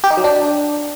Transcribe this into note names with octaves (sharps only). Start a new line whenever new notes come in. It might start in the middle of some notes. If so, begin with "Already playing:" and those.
G4
D#4
F#3
D4